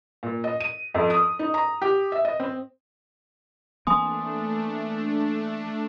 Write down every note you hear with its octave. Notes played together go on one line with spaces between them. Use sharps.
A#2
D#5
D#7
F2
D#6
D#4
A#5
G4
E5
D#5
C4
E3 A3 A#3 C4 D4 G#5 C6 D#6